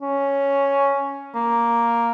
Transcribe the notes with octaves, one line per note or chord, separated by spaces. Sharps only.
C#4
A#3